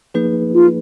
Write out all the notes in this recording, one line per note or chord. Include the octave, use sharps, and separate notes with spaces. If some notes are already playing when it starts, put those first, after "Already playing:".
F3 A#3 D#4 G#4 B4
F4